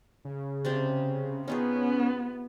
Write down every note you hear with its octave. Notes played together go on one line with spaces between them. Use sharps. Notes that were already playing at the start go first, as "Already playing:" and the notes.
C#3
C3 C4 D4
B3 C#4 D#4 F4 G#4